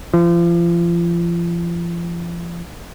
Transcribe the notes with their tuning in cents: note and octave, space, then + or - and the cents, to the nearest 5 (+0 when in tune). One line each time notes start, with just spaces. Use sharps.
F3 -35